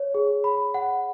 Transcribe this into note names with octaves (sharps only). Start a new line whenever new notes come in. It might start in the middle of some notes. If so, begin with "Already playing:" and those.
Already playing: C#5
G#4
B5
F#5